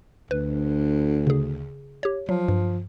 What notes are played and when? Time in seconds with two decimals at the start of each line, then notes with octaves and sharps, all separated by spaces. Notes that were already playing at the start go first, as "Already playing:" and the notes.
0.31 D2 B4
1.27 C#3 G#4
2.03 G4 C#5
2.29 F3 F#3
2.48 G2